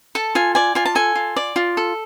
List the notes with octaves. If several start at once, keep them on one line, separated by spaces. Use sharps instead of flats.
A4 A5
F4 G#5
D5 G#5
F4 G#5
A5
A4 G#5
F4
D5
F4
A4